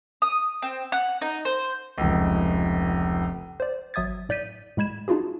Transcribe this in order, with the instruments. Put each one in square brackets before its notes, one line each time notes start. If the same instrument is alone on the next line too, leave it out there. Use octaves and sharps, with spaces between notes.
[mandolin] D#6
C4
F#5
D#4
C5
[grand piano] F1 C#2
[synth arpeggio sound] C5 D5
G#1 F#3 E5 D#6 G#6 A6
A2 D5 G6 B6 D#7
A2 G#3 B5 G#6 E7
D4 D#4 F4 F#4 G#4